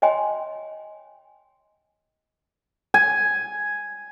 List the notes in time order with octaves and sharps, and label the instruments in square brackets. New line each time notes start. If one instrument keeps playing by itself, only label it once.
[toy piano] C#5 D#5 G5 G#5 B5 C6
[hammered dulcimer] G#5